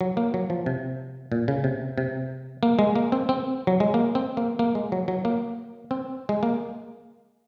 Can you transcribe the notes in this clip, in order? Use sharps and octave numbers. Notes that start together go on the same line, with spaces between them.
F#3
A#3
F#3
F3
C3
A#2
C#3
C3
C3
A#3
G#3
A#3
C4
C4
F#3
G#3
A#3
C4
A#3
A#3
G#3
F#3
F#3
A#3
C4
G#3
A#3